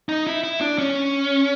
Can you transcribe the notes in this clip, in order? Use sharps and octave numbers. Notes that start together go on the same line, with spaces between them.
D#4
E4
E4
D4
C#4